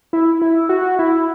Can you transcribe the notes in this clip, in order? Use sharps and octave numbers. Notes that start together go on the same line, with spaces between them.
E4
E4
F#4
E4